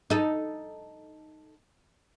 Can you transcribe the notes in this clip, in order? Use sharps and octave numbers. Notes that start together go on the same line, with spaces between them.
D#4 A4